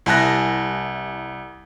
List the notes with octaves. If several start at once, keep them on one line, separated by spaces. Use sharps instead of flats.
C2 E4 G#5 A5 F#6 A#6